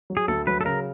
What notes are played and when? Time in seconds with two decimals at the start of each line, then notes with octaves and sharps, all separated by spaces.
0.10 F#3
0.17 G#4
0.28 D2 A4
0.47 F#3 B4
0.61 A4
0.65 C#3 A#4